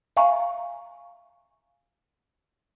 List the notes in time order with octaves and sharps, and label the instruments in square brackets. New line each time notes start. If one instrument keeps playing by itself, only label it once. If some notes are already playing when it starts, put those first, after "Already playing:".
[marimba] E5 F5 G#5 A#5 C#6